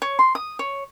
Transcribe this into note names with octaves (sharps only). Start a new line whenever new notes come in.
C#5
C6
D#6
C#5